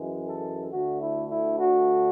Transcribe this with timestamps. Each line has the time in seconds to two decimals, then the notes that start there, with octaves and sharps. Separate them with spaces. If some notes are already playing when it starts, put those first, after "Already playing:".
Already playing: F#2 E3 G#3
0.27 A4
0.71 D2 D3 A3 F#4
1.01 E4
1.30 E4
1.58 F#4